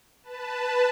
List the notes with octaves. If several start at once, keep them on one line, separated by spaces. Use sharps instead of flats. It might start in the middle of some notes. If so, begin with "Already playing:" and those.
B4 A5